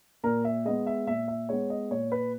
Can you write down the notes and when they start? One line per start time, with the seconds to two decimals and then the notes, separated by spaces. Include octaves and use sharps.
0.24 A#2 A#4
0.45 E5
0.65 G#3 B3 D#5
0.87 E5
1.07 A#2 E5
1.28 E5
1.49 G#3 B3 C#5
1.70 D#5
1.91 A#2 C#5
2.12 B4